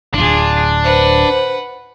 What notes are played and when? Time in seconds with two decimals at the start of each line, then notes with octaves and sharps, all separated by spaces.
0.14 D1 G#1 D4 F4 G#4
0.84 B4 C5 F#5